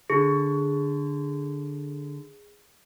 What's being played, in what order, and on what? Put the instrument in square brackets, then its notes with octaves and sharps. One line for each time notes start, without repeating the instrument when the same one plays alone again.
[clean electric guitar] D3 [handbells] G#4